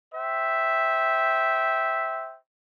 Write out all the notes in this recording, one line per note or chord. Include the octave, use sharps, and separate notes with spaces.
C5 E5 G5